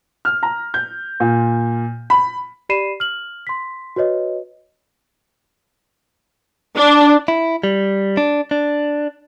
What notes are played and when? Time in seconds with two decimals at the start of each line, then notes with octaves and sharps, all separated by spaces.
0.25 F6
0.43 A#5
0.74 G6
1.20 A#2
2.10 B5
2.69 G4 D5 B5 C7 D#7 E7
3.00 F6 F#7
3.47 C6 B6
3.96 F#4 B4 C#5 D#5
6.77 D4
7.28 E4
7.64 G3
8.17 D4
8.51 D4